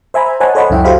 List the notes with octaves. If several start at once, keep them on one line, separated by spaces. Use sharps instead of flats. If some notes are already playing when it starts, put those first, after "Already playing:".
C5 E5 G#5 A#5 B5
C5 C#5 D#5 F#5 G#5 A5
A4 C5 C#5 D#5 F#5 B5
C#2 F#2 E4 E5 G5
F#4 G4 A4 C5 F5 B5